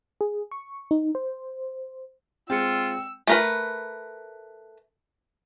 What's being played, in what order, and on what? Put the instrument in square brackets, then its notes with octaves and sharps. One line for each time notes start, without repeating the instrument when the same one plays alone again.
[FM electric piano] G#4
C#6
D#4
C5
[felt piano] G#3 C4 [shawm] F4 [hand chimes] G5 C#7 [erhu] E6
[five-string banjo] A3 A#4 B4